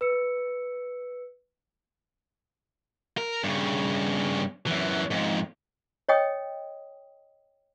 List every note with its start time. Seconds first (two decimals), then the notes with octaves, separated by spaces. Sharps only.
0.01 B4 E6 C#7
3.18 A#4
3.44 G2 C#3
4.67 F#2 E3
5.11 F2 G#2
6.09 C#5 D#5 G5 D#6